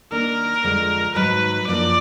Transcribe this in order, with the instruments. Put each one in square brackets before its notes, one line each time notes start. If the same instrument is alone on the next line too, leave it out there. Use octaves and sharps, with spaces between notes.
[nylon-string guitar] D#3 A#3 D4 [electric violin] A#4
[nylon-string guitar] F2 D3 F3 G#3
[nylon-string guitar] G#2 D#3 F#3 [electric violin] B4
[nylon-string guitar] F#2 F3 A#3 D4 [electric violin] D5